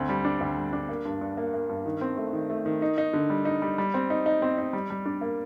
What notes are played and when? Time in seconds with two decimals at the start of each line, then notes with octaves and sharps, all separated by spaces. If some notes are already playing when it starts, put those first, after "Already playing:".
Already playing: D2 C4
0.09 G3
0.25 D4
0.41 D2
0.57 G3
0.73 D4
0.89 A#3
1.05 G2
1.21 G2
1.37 A#3
1.54 A#3
1.69 G2
1.86 D#3
2.01 C4
2.17 A3
2.33 D#3
2.50 A3
2.66 D#3
2.82 D#4
2.98 D#4
3.13 D3
3.30 G3
3.45 D#4
3.62 G3
3.78 G3
3.94 C4
4.10 D#4
4.26 D#4
4.42 C4
4.58 D#4
4.73 G3
4.90 G3
5.06 D4
5.21 A#3